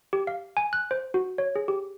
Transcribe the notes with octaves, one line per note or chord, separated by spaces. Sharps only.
G4
F5
G#5
F#6
C5
F#4
C#5
G#4
G4